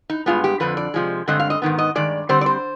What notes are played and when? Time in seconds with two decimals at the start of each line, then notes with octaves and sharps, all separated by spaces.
0.10 D#4
0.26 G2 D#3 G#3 B3 F4
0.44 G4
0.60 F2 D3 F3 B4
0.77 D5
0.94 C3 F3 G#3
1.28 G2 D3 G#3 C4 D#5
1.40 F5
1.50 D#5
1.62 G#2 D#3 B3
1.79 D#5
1.95 G2 D#3 G#3 D5
2.29 D3 G3 C4 C5
2.41 D5
2.46 C5